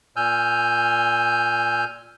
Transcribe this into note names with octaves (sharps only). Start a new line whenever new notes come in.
A#2 G#5 E6 F6 G6